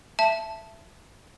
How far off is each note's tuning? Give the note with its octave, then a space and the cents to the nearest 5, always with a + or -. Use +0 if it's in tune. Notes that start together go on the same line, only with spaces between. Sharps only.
E5 +15 A5 +0